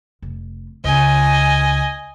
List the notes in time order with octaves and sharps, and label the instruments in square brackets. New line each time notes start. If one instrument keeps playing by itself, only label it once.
[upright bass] F1
[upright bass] C#2 [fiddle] D#5 G#5